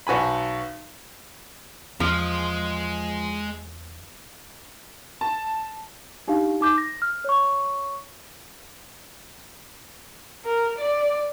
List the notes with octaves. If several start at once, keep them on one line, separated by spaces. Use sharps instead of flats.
B1 F#4 G#5 B5
E2 F3 G#3
A5
D4 D#4 G4 F5
D#4 D6 G6
A#6
F6
C#5 C#6
A#4
D5